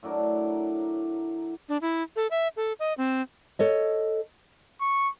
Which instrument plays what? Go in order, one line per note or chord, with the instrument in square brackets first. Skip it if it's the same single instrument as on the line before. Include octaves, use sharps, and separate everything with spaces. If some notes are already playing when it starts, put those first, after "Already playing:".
[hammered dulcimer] A2 F#3 D4 A#4
[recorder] D4
E4
A4
E5
A4
D#5
C4
[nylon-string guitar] A4 C#5 D#5
[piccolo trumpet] C#6